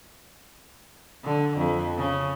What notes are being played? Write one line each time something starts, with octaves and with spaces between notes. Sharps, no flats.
D3
F2
C#3